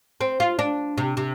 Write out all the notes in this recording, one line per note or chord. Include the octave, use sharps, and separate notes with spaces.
C4
F4
D4
C3
C3